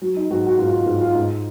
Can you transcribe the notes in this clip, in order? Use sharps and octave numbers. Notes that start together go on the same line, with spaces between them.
F#3
D#4
G#2 F#3 F#4
F#4
G#2 F4
F4
G#2
F4
G#2 D#4